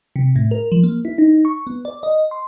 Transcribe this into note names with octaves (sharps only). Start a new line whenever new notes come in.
C3
A2
A#4
F3
A#3
E4
D#4
C#6
B3
D5
D#5
C6